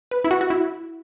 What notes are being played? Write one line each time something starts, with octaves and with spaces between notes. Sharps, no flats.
B4
E4
F#4
F#4
E4